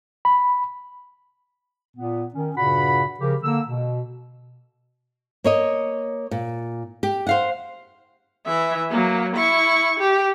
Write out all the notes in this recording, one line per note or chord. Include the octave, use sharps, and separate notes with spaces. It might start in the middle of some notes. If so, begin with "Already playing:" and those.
B5
A#2 B3
D#3 C#4
G2 A#2 C#3 F#4 F#5 B5
C#3 F3 G4 A#4
D3 A#3 E6
B2
A#3 C#5 D#5
A#2
G4
C5 F5 F#5
E3 E5
F#3 A#3
E4 C#6
G4